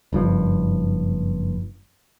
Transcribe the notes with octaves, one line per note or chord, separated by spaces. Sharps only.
F#1 G2 F3